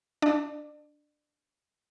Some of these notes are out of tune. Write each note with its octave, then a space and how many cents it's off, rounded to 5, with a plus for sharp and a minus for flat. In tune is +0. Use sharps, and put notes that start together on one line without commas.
D4 +0 D5 +35